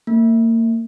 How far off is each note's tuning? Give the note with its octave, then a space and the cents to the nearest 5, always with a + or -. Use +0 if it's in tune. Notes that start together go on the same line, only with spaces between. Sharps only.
A#3 -35